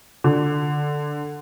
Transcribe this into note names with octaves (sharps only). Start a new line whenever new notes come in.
D3